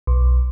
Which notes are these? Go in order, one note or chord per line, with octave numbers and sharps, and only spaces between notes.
B1